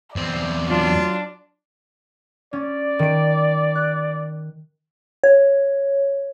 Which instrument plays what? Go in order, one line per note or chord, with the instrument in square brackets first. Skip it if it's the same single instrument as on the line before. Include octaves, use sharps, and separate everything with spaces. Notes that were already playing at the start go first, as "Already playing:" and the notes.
[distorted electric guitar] E2 C4 [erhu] D5
[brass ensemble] F#3 F4 [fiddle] D4
[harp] C#4 [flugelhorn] D5
[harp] D#3 D7
F#6
[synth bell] C#5